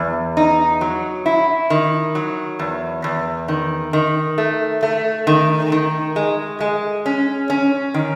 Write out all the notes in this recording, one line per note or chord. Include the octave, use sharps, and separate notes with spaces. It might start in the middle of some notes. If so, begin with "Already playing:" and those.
Already playing: E2
D#4
F#3
E4
D#3
F#3
E2
E2
D#3
D#3
A3
A3
D#3
D#3
G#3
G#3
C#4
C#4
D#3